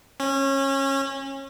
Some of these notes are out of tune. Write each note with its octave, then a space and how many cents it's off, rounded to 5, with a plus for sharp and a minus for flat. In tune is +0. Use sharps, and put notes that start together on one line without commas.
C#4 -25